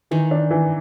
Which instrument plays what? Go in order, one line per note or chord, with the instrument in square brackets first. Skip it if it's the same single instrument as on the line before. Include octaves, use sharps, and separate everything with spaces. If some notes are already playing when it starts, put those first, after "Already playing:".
[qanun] D#3 [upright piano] E3
[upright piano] D4
E3